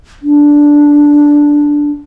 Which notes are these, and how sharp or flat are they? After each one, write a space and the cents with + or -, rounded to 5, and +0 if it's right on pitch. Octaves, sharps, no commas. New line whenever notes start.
D4 -5